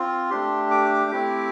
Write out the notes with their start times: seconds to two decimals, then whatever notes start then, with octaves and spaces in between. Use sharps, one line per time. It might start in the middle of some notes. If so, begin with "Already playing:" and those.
Already playing: C4 F4
0.30 A3 D4 G4 C6
0.71 D6
1.11 A3 C4 E4 G4